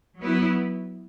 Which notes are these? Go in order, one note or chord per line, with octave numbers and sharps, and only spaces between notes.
F#3 B3 E4